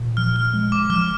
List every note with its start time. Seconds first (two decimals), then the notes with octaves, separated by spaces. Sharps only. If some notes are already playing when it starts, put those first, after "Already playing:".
Already playing: A#2
0.17 F3 F6
0.36 F6
0.53 G#3
0.72 D6
0.90 F3 F6